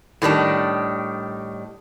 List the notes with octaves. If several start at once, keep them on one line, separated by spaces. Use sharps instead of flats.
A2 D#3 G3 D4